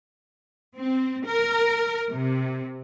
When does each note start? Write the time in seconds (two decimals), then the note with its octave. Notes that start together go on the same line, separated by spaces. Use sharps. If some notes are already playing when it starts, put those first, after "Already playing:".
0.77 C4
1.26 A#4
2.10 C3